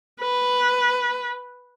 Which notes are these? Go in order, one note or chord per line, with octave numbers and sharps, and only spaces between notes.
B4